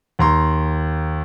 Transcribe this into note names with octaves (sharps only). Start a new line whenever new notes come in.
D#2 A#5 C6